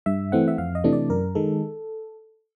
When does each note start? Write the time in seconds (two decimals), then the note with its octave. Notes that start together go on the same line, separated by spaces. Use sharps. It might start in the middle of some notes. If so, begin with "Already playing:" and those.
0.06 G2 E5
0.32 E3 A3 C4 F#5
0.48 E5
0.58 F2 F5
0.75 D#5
0.84 C3 E3 A3 D4
0.93 D5
1.10 F#2 A#4
1.35 D#3 G#3 A4